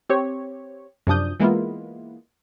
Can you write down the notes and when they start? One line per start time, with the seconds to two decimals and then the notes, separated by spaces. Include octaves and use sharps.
0.09 C4 G4 C#5
1.07 F#2 C3 F3 D4 D#6 G6
1.40 E3 G#3 A#3 B3 E4 F4